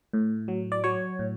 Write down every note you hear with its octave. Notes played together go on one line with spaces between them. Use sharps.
A2
F#3
D5
F#3 C#5
A2